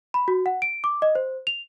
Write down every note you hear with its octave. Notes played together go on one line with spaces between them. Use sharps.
B5
F#4
F#5
D7
D6
D#5
C5
F7